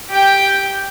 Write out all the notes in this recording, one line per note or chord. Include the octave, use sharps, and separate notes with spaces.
G4 G5